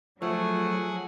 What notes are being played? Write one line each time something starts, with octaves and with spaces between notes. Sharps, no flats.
F3 F#3 A3 G#4 F#5 G#5